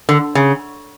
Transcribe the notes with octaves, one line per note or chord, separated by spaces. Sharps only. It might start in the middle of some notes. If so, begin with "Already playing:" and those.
D3
C#3